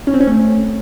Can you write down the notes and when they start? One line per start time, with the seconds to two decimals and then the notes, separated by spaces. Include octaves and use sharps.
0.07 C#4
0.14 C4
0.20 C#4
0.27 A3